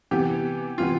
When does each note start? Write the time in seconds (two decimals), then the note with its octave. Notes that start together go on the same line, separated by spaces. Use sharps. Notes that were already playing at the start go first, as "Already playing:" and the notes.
0.11 C3 E3 B3 G4
0.78 C3 E3 B3 F4